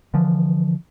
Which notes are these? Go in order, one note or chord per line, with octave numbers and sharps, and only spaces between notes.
D3 E3 F3